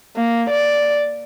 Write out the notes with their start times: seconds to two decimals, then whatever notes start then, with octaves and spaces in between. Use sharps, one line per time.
0.16 A#3
0.50 D5